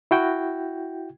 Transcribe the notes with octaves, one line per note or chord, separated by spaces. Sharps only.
E4 F#4 G5